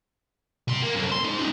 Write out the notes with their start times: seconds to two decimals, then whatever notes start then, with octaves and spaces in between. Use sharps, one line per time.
0.68 C3 C6
0.82 A#3
0.95 F#2 A4
1.11 C6
1.24 D#4 G#4
1.39 C#4 D#4